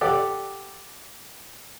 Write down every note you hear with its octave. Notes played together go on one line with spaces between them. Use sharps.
G4 A4 D5 F#5